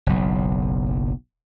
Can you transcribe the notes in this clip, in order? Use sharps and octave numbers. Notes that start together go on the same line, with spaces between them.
F#1 B1